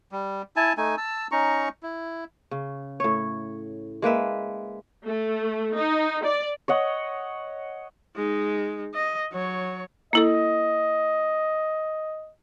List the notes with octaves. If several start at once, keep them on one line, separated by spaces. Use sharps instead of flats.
G3
E4 G#5 A5
A3 D#4 G#5
A5 E6
C#4 D#4 A#5 C#6
E4
C#3
A2 C#5
G#3 A#3 B4 E5
A3
D#4
D5
C#5 D#5 F#5
G#3 D#4
D#5
F#3 C#5
A#3 E4 A4 D#5